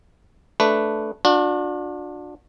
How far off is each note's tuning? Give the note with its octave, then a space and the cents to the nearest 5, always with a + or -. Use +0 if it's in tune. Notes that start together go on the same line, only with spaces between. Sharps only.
A3 -5 D4 +0 B4 +5
D4 +10 F#4 -45